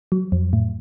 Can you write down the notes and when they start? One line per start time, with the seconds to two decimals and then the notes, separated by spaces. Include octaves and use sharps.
0.12 F#3
0.32 F2
0.53 A2